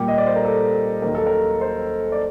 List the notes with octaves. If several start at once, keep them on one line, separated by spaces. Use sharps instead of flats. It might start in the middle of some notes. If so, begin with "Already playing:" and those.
Already playing: A#2 G3 A#3 G4
D#5
D5
C5
A#4
A4
D#2 D#3 F#3 A#3 A#4
A4
A#4
C5
D5